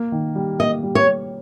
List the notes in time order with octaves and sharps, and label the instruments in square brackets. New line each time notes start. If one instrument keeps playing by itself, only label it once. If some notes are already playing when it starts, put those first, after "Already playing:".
Already playing: [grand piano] A#3
D#3
G3
[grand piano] A#3 [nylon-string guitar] D#5
[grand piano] G3
[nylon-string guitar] C#5
[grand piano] G3